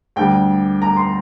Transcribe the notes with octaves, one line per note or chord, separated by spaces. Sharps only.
D2 D3 G3 G5
A#5
C6